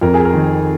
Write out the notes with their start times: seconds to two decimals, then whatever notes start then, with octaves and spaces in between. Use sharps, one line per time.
0.01 F2 A#4
0.14 G#4
0.25 A#4
0.34 D#3